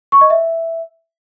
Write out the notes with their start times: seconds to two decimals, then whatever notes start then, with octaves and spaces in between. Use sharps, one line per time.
0.12 C#6
0.21 D#5
0.30 E5